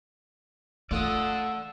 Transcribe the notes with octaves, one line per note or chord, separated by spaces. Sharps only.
A3 F4 A4 D5 F#5 D#6 E6